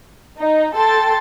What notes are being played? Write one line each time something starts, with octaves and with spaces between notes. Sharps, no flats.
D#4
A4 G5 A5 C6 A6